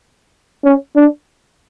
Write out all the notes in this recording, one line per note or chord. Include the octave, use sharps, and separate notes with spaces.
C#4
D4